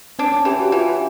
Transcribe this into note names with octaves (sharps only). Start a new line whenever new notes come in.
C4 D4
C#4
E3 G4
F#4
E3 F4